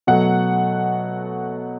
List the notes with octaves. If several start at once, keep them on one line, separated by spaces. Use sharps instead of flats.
B2 F#3 A3 F#5